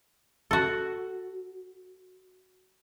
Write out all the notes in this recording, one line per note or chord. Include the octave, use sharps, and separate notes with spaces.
F#4 A4